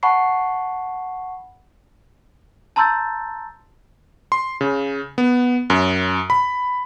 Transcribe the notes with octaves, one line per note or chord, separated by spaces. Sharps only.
F#5 A5 B5 C#6 C7
A5 A#5 C6 E6 G6 A6
C6
C#3
B3
F#2
B5